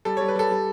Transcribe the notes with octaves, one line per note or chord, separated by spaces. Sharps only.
G3 A4
G3 C#5
B4
G3 A4
G3